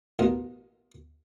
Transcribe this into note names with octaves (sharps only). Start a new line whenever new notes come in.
A1 B2 D#4 A#4